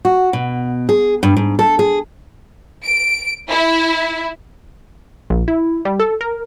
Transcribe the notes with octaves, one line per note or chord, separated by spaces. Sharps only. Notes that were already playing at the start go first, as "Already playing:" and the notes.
F#4
B2
G#4
G2
G#2
A4
G#4
D7
E4
A#1
E4
G3
A4
A#4